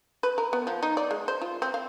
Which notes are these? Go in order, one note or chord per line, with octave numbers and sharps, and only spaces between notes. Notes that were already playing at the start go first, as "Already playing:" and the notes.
B4
A#4
B3
F3
D#4
D5
G#3
C5
F4
C4
F5